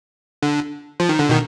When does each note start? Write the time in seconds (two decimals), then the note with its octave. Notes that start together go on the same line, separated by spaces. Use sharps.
0.42 D3
1.00 F3
1.09 D#3
1.19 D3
1.29 B2 D#3